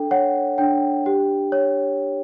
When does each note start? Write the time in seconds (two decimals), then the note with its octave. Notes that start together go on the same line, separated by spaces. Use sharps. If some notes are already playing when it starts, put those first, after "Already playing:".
Already playing: D4 A4 G5
0.11 C#5 F#5
0.58 D4 G5
1.06 G4
1.52 C#5